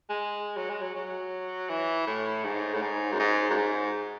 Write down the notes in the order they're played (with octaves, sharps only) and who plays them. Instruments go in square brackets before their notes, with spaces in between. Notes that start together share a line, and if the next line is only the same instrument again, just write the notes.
[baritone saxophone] G#3
F#3
G#3
F#3
F#3
E3
A2
G#2
A2
G#2
F#2
G#2
F#2
G#2